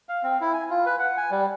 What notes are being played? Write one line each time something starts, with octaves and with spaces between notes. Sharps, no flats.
F5
C4
E4
G#5
F4
B4
F#5
G#5
G3